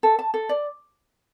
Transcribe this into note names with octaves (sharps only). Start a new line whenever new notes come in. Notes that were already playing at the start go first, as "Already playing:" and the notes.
A4
A5
A4
D5